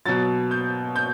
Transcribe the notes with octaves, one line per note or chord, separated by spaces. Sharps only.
B2 F#3 A6
G6
G6